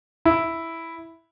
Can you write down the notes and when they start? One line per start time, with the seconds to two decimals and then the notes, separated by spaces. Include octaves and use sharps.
0.25 E4